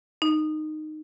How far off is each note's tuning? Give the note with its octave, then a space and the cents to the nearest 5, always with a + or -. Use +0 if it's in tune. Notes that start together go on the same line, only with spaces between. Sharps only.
D#4 -15